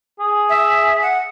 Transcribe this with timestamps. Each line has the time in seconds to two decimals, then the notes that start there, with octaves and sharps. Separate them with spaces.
0.20 G#4
0.49 E5
1.02 F#5